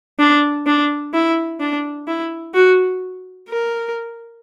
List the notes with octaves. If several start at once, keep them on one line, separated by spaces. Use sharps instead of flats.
D4
D4
E4
D4
E4
F#4
A#4